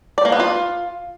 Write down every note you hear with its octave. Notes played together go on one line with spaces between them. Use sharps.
D5
A#3
B3
F4